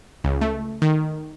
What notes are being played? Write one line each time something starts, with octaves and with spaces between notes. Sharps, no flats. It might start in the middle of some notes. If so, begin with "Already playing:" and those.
C#2
A3
D#3